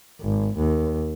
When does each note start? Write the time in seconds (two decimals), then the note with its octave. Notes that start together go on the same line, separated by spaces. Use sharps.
0.21 G#1
0.57 D#2